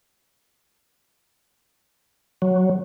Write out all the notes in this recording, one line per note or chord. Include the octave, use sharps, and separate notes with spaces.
F#3